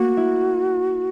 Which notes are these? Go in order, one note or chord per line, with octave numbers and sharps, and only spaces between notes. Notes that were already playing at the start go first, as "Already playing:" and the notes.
Already playing: A#3 F#4
E4